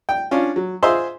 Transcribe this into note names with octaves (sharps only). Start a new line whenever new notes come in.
G5
C#4 D4 F4
F#3
F4 G#4 C5 D#5 E5 C6